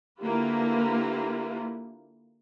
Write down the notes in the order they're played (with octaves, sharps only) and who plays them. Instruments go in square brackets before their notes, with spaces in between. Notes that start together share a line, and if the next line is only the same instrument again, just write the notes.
[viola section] D3 A#3 E4 F4 G4 B4